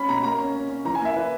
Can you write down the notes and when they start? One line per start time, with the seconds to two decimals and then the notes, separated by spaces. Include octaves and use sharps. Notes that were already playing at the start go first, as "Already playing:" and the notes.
Already playing: C#4 B5
0.09 B2 A#5
0.23 A#3 A#5
0.39 C#4
0.55 C#4
0.69 C#4
0.85 E3 A#5
0.95 G#5
1.01 A#3 E5
1.16 E3 B4